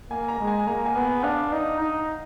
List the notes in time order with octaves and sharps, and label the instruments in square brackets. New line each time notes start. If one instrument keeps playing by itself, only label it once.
[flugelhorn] A#3 [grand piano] G#5
[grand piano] A#5
[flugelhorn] G#3
[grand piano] G#5
[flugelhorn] A#3 [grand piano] A#5
[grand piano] G#5
[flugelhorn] B3
[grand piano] F#5
[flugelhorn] D4 [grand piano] F5
[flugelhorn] D#4
D#4